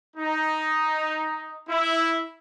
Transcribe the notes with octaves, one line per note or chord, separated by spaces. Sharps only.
D#4
E4